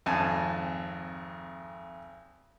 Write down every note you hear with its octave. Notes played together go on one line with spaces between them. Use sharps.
G#1 F2 G#5 A5